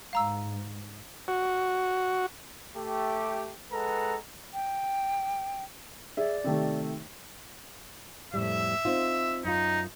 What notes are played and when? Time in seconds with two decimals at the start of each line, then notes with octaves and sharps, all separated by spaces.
0.13 G#2 F5 A#5 E6
1.28 F#4
2.75 A3 G4
3.72 G#3 A4 B4 F#5 A#5
4.54 G5
6.17 G#4 D5 E5
6.44 C3 D#3 A3
8.34 F2 A2 G3 E5
8.85 C4 D#4 F4
9.44 F#2 D#4 F4